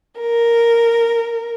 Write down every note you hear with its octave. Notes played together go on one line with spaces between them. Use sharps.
A#4